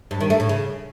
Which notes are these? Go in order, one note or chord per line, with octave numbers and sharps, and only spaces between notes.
G2
D#3
A3
A2
C#3